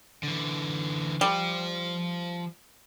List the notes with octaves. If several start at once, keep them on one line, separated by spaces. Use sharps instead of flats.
D3 E3
F3 G3 F4